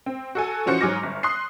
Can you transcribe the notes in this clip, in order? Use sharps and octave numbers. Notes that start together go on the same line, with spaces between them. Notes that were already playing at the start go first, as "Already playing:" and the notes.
C4
F#4 A4 G#5
E3 F3 C#4 F#4 C5 C#7
G#2 F#3 G#5 D6 F6 A#6
G1
C6 D#6 F#6 C7